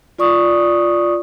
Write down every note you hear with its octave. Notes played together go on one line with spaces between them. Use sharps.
F4 D5 C#6 D#6